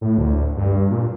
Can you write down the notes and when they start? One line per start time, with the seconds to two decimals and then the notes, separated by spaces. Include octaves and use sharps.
0.01 A2
0.18 D2
0.57 G2
0.91 A#2